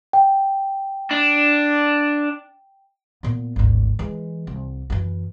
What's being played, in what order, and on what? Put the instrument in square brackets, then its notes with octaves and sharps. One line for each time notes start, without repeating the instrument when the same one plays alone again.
[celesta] G5
[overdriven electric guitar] D4
[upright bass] A#2 B3
G#1 D2
E3 G#3
C2
F#2 E3